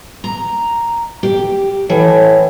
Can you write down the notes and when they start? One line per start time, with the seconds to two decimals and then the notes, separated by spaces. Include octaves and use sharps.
0.24 A#5
1.23 G4
1.89 A2 E3